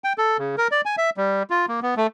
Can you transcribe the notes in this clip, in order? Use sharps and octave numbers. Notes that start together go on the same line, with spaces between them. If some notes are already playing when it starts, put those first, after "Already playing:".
G5
A4
C#3
A#4
D5
G#5
E5
G3
F4
A#3
B3
A3